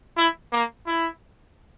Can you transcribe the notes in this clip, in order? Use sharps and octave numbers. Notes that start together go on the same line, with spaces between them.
E4
A#3
E4